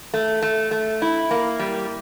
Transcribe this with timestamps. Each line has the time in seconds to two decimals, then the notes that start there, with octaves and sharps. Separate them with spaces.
0.14 A3
0.42 A3
0.71 A3
1.02 E4
1.31 A#3
1.59 G3